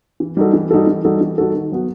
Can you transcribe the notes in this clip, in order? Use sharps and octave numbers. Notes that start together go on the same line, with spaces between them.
E3
G3 D#4 F#4 A4
E3
G3 D#4 F#4 A4
E3
G3 D#4 F#4 A4
E3
G3 D#4 F#4 A4
D#3
F#3 B3 F#4